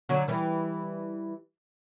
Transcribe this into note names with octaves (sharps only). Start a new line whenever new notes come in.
D3 F#3
E3 G3